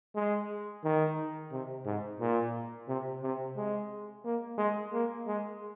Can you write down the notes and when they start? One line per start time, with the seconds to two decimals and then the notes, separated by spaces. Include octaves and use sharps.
0.16 G#3
0.84 D#3
1.52 C3
1.86 G#2
2.20 A#2
2.88 C3
3.23 C3
3.56 G#3
4.25 A#3
4.58 G#3
4.93 A#3
5.27 G#3